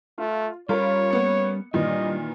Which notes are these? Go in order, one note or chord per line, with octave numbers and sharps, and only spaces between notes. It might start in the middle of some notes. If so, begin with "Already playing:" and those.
A3 F4
G3 C#4 F4 A#4 C#5 B5
A#3 B3 C#7
A#2 D#3 E3 G3 D4 D#5